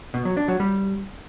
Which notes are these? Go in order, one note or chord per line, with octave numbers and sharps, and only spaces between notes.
B2
F#3
D4
F#3
G3